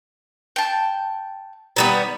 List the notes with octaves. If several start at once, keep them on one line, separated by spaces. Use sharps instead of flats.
G5 A5
D#3 G3 B3